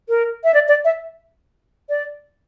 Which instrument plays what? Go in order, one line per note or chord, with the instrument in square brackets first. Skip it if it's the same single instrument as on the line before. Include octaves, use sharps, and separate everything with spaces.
[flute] A#4
E5
D5
D5
E5
D5